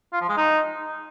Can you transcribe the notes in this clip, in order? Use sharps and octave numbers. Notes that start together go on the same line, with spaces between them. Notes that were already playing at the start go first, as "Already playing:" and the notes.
F4
F3
G#3
D#4